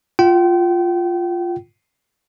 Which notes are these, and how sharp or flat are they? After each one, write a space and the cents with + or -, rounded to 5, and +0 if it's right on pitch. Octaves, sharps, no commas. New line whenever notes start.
F4 +0 G5 -35